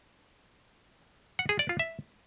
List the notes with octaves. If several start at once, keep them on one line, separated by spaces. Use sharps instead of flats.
F#5
G#4
D5
F4
E5